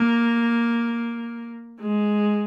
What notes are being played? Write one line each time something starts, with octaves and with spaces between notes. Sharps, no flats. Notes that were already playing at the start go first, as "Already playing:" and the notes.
Already playing: A#3
G#3